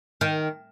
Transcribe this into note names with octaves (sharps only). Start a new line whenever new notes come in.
D#3